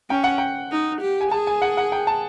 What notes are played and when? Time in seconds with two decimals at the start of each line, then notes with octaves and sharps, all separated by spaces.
0.10 C#4 G5
0.24 F#5
0.38 G5
0.71 D#4
1.01 G4
1.21 G#5
1.31 G#4 A5
1.47 G#5
1.62 F#5
1.77 F#5
1.92 G5
2.07 A5